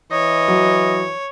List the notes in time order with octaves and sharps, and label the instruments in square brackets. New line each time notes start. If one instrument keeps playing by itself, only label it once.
[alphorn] E3 [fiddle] C#5 [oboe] D#5
[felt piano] F#3